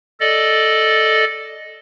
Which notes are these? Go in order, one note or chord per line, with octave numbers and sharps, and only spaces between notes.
A4 D5 D#5